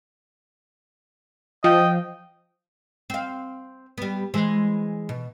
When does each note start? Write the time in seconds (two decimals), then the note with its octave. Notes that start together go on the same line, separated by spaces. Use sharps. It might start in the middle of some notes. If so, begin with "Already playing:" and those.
1.64 F3 D#5 G5
3.10 C4 F5
3.98 G3 B3
4.34 E3 G#3 C5
5.09 B2